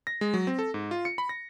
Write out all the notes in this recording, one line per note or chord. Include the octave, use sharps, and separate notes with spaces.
A#6
G#3
F#3
C4
A4
G#2
F4
C#7
B5
A#6